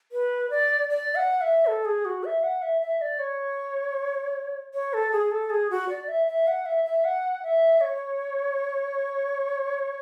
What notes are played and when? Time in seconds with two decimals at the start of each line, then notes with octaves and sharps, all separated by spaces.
0.12 B4
0.50 D5
0.90 D5
1.15 F#5
1.41 E5
1.66 A4
1.85 G#4
2.05 F#4
2.24 E5
2.43 F#5
2.62 E5
2.81 E5
3.01 D5
3.19 C#5
4.74 C#5
4.93 A4
5.12 G#4
5.31 A4
5.50 G#4
5.70 F#4
5.89 D5
6.08 E5
6.27 E5
6.47 F#5
6.66 E5
6.85 E5
7.05 F#5
7.43 E5
7.81 C#5